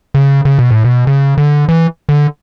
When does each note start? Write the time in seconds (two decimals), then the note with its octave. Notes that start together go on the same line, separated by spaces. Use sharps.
0.14 C#3
0.45 C#3
0.59 B2
0.71 A2
0.84 B2
1.07 C#3
1.38 D3
1.69 E3
2.09 D3